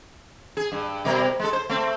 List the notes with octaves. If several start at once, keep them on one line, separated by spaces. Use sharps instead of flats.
G#4
G2
B2 G3 A#4
G#3 A4
C5
A3 C4